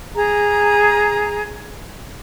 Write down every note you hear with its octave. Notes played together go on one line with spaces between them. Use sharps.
G#4 A#5